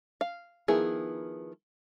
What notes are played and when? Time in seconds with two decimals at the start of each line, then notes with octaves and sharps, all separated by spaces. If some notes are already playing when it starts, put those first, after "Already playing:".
0.21 F5
0.68 D#3 F3 B3 E4 G#4